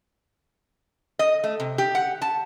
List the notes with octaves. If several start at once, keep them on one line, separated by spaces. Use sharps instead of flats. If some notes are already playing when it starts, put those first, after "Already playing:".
D#5
A3
C3
G4
F#5
A5